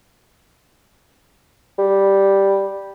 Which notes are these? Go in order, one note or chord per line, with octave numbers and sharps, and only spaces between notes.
G3